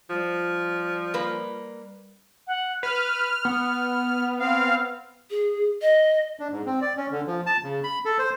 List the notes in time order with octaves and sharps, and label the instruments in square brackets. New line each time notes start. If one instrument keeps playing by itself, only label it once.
[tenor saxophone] F3 [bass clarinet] G3
[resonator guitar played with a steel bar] A#3 B4
[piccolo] F#5
[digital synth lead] B4 [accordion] F6
[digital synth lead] B3
[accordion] C4 F5
[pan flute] G#4
D#5
[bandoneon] D4
G#2
C4
D5
C#4
D3
F3
A5
C#3
B5
A4
C5